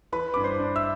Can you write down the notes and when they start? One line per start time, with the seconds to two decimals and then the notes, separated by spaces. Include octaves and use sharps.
0.12 E3 B4 B5
0.34 G2 D6
0.44 C5 C6
0.59 D4
0.76 E5 E6